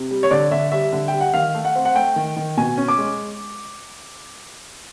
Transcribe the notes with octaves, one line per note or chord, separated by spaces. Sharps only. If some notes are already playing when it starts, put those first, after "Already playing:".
Already playing: C3
G3
C#5
D3 D5
D3 E5
G3 E5
D3
G5
G3
F#5
D#3 F5
A3
F#5
C4
F#5
A3 G5
D#3
D#3
B2 G#5
C#4
D6
G#3